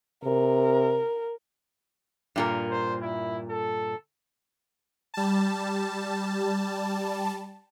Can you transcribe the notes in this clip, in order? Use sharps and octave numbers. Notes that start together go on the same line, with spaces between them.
C3 A#4
G2 A#2 A#4
C5
E4
A4
G3 A5